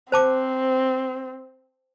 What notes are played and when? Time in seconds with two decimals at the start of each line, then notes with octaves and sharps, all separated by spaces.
0.12 C4 C5 A5 D6